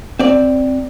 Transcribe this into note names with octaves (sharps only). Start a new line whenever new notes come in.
C4 D5